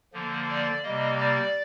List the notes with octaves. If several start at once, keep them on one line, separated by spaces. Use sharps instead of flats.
D3 F3 A#3
D5
C3 G3 A#3 D#5
D5